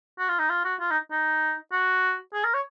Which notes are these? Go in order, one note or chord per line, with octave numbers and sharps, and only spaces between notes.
F#4
F4
D#4
F4
F#4
F4
D#4
D#4
F#4
G#4
A#4
C#5